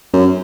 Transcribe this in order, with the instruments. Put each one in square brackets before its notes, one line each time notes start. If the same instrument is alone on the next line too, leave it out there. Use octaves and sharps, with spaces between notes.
[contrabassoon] F#2